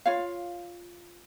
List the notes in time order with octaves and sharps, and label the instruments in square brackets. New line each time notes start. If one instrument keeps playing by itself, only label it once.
[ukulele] F4 C#5 F5